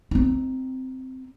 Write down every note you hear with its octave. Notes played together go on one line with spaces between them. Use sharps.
C4 D#4